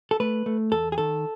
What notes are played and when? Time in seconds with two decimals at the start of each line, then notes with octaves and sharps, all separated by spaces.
0.11 A4
0.20 A3 B4
0.46 A3
0.71 E2 A4
0.92 G#4
0.98 D#3 A4